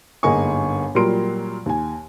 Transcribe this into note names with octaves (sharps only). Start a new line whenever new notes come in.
G1 G#2 A#3 D#5 G#5 C#6
A#2 F#3 G3 A#4 C6 D7
D#2 G#5